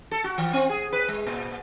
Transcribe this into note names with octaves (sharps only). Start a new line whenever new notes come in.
A4
F#4
E3
C4
G#4
B4
G#3
A#2